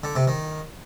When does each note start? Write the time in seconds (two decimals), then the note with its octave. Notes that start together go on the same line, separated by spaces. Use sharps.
0.04 D3
0.15 C3
0.27 D#3